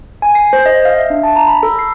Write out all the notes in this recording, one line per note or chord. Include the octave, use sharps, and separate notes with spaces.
G#5
C7
C5
D#5
F5
E5
D4
A5
A#5
B5
A4
C7